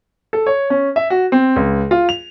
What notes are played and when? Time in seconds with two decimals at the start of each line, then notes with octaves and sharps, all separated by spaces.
0.33 A4
0.46 C#5
0.70 C#4
0.96 E5
1.10 F#4
1.32 C4
1.56 C#2
1.91 F4
2.09 F7